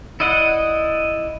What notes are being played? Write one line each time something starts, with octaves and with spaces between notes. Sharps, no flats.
E4 D5 D#5 F#5